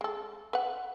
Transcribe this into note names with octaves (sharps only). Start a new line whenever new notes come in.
G#3 A4
B4 F#5